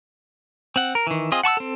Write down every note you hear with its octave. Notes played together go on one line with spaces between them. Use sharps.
C4 F#5
A#4
D#3 E3
C4 F4 G#4 D#5
F#5 A5 C#6 E6
C4 A4